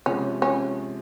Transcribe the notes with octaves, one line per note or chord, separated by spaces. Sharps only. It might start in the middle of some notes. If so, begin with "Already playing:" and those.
C3 F3 G#3 C#4
C#4